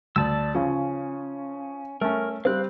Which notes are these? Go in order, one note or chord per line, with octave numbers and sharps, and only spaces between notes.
D2 D5 A5 E6
C#3 F3 C#4
A3 C#4 A#4
G3 C4 F5 F#6